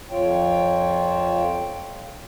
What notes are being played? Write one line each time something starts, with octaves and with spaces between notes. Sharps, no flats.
F2 F3 F4 C#5 G5